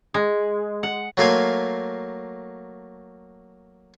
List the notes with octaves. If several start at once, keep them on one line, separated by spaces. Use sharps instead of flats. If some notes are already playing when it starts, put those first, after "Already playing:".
G#3
F#5
F#3 A3 A#3 F5 G#5 C6